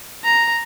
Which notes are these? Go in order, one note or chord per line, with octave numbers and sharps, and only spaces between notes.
A#5